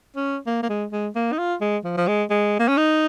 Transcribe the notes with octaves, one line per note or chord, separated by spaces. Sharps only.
C#4
A#3
A#3
G#3
G#3
A#3
D#4
F4
G#3
F3
F3
G#3
G#3
A#3
C#4
D#4